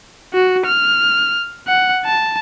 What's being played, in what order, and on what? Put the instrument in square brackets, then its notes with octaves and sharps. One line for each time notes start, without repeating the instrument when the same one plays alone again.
[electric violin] F#4
F6
F#5
A5